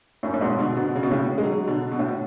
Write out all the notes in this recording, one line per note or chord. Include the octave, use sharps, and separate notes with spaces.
F#2 A2
A2
G#2 B2
B2 D3
B2 D3
C#3
B2
A2 C#3
G#3
D3 F#3
B2 D3
B2
A2
B2